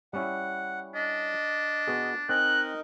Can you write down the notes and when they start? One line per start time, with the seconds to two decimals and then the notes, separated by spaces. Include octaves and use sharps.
0.13 G3 C#4 E4 F#5
0.95 D4 D#5
1.87 B3 F#4 G#4
2.29 C4 D#4 A#4 D#5 G#5 F#6